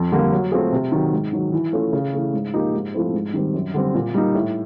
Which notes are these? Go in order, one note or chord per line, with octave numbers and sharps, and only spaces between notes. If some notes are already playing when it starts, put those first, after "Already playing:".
Already playing: F2
D3 G3 A#3
F#3
A3 C4 F4 G#4
C3
D#3 F#3
G#2
D#3 F#3
E3
A3 C#4 F4 A4
C#3
E3 A3
G#2
F3 A#3 D#4 G4
G#2
F3 A3 C4 E4
G#2
D#3 G3 C4
F#2
D3 G3 C4
A#2
G3 A#3 D#4
A2